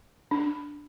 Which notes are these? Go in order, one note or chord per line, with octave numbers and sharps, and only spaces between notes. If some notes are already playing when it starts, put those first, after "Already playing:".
D4